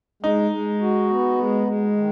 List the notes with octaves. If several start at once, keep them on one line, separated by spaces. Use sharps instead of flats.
G#3 D#4
G#3
F#4
B3
G#3
G#3
D#3